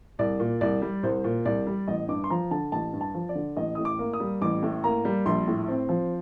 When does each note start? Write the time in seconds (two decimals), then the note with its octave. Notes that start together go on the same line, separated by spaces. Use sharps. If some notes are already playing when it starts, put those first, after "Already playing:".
0.19 C2 D5
0.40 A#2
0.61 C2 D5
0.82 G3
1.03 C2 C5
1.24 A#2
1.45 C2 D5
1.67 G3
1.88 A1 D#5
2.09 G2 D6
2.24 C6
2.30 F3 A#5
2.51 D3 A5
2.72 A1 A5
2.93 G2
3.01 A5
3.15 F3
3.29 D5
3.35 D3
3.56 A1 D#5
3.75 A2 D#6
3.85 D6
3.99 A#3
4.13 D#6
4.20 G3
4.41 A1 D6
4.63 A2
4.84 A#3 A#5
5.05 G3
5.26 A#1 C6
5.47 A2
5.68 C4
5.89 F3